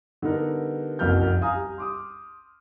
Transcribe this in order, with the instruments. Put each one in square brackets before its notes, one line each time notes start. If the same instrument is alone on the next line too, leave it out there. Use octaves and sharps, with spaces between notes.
[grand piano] D3 G3 B3 D#4 G4 A#4
F#1 C2 F2 F#4 F6 G6
F5 G#5 A#5 D#6
G3
C6 D6 D#6